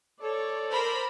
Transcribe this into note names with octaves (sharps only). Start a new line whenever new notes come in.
A4 C#5 D5
A#4 C5 B5